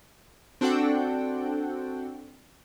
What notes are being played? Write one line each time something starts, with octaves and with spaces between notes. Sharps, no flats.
C4 D4 F#4 A4 F#5 G5